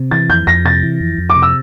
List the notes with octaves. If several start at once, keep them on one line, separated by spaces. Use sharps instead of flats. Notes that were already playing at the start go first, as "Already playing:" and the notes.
Already playing: C3
E3 A6
F2 G6
F2 A#6
C3 A6
E3
F2
F2
D6
C3
E6